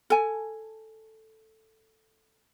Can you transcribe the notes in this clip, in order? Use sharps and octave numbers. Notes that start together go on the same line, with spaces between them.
A4 G#5